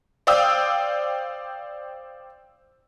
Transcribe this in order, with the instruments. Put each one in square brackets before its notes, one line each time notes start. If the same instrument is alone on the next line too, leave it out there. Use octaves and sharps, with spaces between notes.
[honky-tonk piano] C5 D5 F5 G5 D#6 E6